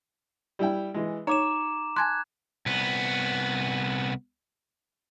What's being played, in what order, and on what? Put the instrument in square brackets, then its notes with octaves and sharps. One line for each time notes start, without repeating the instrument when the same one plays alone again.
[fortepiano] G3 E4 G5
E3 G#3
[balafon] D#4 [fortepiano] C#5 [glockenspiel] A#5 D6 E7
[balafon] G#5 A5 C6 [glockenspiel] F#6 G#6
[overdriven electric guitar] C2 B3